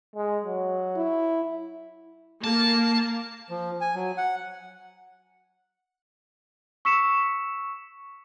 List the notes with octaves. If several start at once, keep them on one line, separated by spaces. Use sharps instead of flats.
G#3
F#3
E4
A#3 A5
F3
G#5
F#3
F#5
C#6 E6 B6 C#7 E7